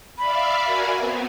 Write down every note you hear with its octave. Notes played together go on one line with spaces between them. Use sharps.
D5 E5 F5 B5
F#4 A#4 G#5
B3 C4